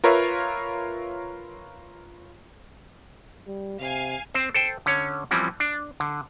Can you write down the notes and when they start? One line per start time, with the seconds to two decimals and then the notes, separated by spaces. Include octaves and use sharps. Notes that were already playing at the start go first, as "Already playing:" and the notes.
0.04 F4 A#4 B4 C#5 E5 F5
3.47 G3
3.80 C3 F5 G#5
4.34 C4 C5
4.54 A4 C5 G5
4.86 D3 C#4 C#5
5.31 E3 F3 G3 C4 C#4
5.60 D4
6.00 D3